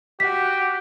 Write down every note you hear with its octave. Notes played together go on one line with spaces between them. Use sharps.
F#4 G4 B6